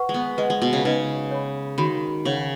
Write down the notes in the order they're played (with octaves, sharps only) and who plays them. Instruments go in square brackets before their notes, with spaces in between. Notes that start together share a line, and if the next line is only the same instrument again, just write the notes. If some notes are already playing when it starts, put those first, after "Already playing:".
Already playing: [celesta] B4 F#5 C#6
[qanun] G#3
B3
[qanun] G#3 [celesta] B4 D#5 F#5
[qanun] G#3
B2
C#3
[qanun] C#3 [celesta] D#4 B4 D#5
[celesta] C#5 B5
[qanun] D#3 [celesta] F#4 C#5 B5
[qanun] C#3 [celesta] G#4 C#5 F#5